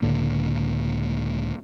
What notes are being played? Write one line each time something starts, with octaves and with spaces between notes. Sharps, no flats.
C#2 A2 D3 A#3